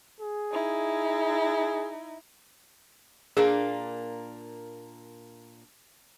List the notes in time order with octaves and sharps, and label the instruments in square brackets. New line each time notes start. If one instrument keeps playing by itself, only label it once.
[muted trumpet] G#4
[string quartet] D#4 E4
[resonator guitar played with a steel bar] A#2 A#3 D4 [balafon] G#4